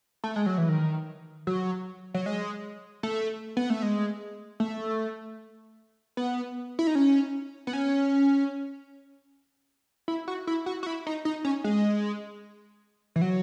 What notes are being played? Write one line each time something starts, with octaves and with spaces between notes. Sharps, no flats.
A3
G#3
F#3
E3
D#3
F#3
F#3
G#3
A3
B3
A3
G#3
A3
B3
E4
D#4
C#4
B3
C#4
E4
F#4
E4
F#4
F#4
E4
D#4
D#4
C#4
G#3
E3
F#3